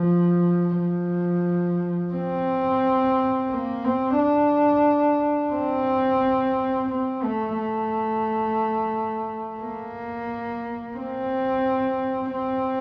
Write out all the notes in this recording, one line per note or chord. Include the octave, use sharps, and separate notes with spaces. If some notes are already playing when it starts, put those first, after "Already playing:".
Already playing: F3
F3
C4
A#3
C4
D4
C4
C4
A3
A3
A#3
C4
C4